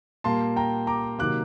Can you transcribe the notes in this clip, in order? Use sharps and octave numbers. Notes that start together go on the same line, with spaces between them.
A#2 G3 A#3 A5 C6
G5 A#5
A#5 D6
C3 D#3 F#3 A#3 D6 F#6